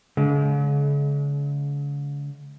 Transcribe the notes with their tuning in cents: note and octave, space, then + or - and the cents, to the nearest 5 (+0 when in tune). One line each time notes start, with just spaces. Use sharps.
D3 -45 G#3 +45